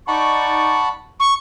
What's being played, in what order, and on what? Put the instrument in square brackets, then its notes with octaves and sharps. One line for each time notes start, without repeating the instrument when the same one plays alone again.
[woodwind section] D#4 D5 C#6 [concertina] F#5 A5 B5
[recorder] C#6